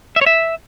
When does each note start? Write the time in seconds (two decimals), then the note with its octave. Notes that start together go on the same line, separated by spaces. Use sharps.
0.16 E5
0.21 C#5
0.26 E5